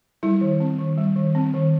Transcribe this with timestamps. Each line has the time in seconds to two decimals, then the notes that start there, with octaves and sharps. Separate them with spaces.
0.23 G3 E4
0.41 D#3
0.60 C4
0.78 D#3
0.98 G3
1.16 D#3
1.35 C4
1.54 D#3